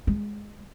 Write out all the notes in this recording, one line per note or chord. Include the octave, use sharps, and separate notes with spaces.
G#3